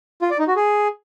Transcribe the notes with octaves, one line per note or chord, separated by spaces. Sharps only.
F4
D5
D#4
F#4
G#4